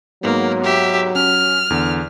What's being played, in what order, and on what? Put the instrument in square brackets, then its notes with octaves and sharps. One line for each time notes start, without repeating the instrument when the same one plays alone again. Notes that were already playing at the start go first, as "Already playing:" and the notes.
[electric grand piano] G#2 B3 [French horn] F#3 [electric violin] A#3
[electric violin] G4 E5
[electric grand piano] C#4 [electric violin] F6
[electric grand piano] E2 D3